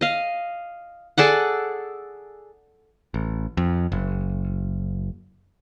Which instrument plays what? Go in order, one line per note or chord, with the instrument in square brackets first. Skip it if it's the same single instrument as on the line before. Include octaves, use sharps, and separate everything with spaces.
[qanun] D#5 F5
G#4 A4 D5 F#5
[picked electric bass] A1
F2
F#1